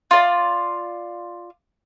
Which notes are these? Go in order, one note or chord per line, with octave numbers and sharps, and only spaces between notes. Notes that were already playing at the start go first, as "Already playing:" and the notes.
F4 D5